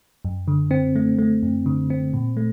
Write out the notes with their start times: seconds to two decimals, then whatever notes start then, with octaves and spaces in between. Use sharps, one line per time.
0.25 F#2
0.48 D3
0.71 C4
0.96 A3
1.18 A3
1.43 F#2
1.66 D3
1.90 C4
2.13 A#2
2.37 A3